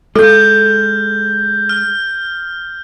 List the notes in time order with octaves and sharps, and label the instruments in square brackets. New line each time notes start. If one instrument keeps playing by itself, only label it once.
[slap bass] G#3 [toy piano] A4 [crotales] F6 G6
[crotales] F6